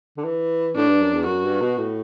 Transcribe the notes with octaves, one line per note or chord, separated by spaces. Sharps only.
D3
E3
A2 D4
G2
F#2
E2
F#2 F#4
G2
B2
A2